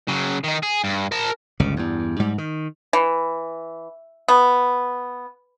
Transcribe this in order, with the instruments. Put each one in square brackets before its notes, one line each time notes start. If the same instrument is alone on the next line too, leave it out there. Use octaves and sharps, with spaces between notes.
[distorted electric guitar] C#3 F#3
D#3 D#4
G#4
G2
A#4 A5
[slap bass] G1 C#2 C#3
E2 G2
G#2 G3
D#3
[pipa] E3
B3